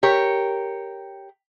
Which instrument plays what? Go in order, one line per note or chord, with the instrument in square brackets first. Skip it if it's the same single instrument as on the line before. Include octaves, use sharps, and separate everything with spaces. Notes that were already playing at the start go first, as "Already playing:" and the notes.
[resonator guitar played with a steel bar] G4 A#4 C#5